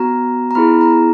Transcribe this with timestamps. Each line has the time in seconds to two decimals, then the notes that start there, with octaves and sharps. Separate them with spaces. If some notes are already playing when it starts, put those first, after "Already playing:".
Already playing: B3 F#4 A#5
0.51 A#5
0.55 B3 E4 G#4 B5
0.81 A#5